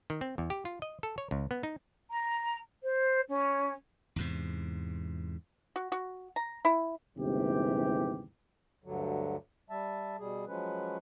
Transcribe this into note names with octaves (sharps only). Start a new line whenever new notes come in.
D#3
C4
E2
G4
F4
D#5
A4
C#5
C#2
B3
D#4
A#5
C5
C#4
E2 G#2 C3
F#4
F#4
A#5
E4
G1 D#2 C3 E3 G#3 G4
D2 G2 D3 F#3
G3 E5 A5
B2 G3 G#4
F3 F#3 G#3 C#4 B4